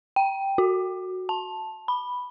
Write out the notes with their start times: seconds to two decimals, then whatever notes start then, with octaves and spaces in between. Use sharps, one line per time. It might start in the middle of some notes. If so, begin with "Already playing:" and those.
0.16 G5
0.58 F#4
1.29 A5
1.88 B5